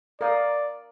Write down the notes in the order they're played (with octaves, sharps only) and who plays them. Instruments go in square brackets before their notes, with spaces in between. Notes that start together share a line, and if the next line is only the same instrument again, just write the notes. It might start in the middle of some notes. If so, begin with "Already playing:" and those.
[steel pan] A#4 F5 D#6 [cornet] D5